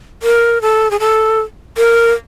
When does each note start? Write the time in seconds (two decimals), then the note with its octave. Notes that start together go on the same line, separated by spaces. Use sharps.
0.23 A#4
0.62 A4
0.91 G#4
1.00 A4
1.78 A#4